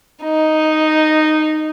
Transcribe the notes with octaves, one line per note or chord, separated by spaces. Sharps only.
D#4